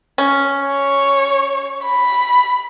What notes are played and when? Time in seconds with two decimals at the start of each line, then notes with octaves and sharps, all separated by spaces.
0.18 C#4
0.67 C#5
1.85 B5